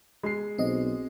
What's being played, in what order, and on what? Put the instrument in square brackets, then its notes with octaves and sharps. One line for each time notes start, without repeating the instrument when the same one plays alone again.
[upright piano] G#3 C7
[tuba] B1 [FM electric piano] C4 D#5